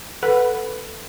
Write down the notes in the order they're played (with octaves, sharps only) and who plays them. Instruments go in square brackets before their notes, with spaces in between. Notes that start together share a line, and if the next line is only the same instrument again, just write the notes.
[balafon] A4 F#5 [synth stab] B4